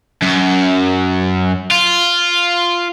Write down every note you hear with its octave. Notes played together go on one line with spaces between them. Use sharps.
F#2
F4